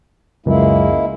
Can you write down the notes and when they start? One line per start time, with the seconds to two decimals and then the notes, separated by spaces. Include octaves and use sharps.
0.46 C#2 F#2 G#3 A#3 E4